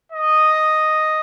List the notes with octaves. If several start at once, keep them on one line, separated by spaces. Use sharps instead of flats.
D#5